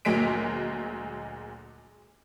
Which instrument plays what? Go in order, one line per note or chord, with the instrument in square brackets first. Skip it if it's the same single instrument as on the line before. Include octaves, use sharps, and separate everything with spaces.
[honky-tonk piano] D2 A#2 F#3 G#3 B6 D7